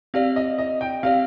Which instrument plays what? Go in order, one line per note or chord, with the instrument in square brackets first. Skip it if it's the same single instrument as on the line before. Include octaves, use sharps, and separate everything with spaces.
[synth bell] C4 G4 D5 [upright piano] F5
[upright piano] D#5
D#5
G5
[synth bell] C4 G4 D5 [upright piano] F5